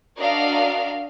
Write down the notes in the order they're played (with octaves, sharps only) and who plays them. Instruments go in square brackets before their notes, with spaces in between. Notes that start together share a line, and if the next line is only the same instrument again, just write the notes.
[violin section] D4 F#4 A#4 D5 D#5 F5